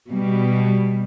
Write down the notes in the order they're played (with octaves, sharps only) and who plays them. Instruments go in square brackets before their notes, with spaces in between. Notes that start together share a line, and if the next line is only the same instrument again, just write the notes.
[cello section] B2 G3